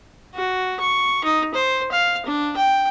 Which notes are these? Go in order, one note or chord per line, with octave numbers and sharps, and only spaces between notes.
F#4
C#6
D#4
C5
F5
D4
G5